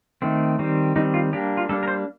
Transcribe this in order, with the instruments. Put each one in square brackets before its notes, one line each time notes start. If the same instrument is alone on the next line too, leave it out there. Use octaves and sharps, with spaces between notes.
[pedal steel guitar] D#3 A3 C4
D#3 G3 C4
D#3 G3 C4 D#4
F4
G3 A#3 D4 G4
F4
G3 A#3 D4 A4
A#4
C5